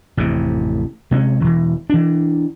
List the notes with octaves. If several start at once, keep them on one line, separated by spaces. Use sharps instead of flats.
A1 F2 C3
C3 G#3 A3 C#4
E1 E3
E3 D4